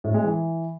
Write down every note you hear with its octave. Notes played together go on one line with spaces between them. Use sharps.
A2
G#3
E3